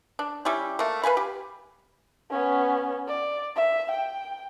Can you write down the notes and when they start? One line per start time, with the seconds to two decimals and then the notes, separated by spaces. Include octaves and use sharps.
0.19 D4
0.45 G3 C#4 E4 G4
0.79 A3 A#3
1.04 B4 F5 G#5 B5
1.17 G4
2.31 B3 C#4
3.08 D5
3.56 E5
3.91 G5